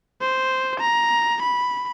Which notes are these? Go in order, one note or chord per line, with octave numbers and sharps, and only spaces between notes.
C5
A#5
B5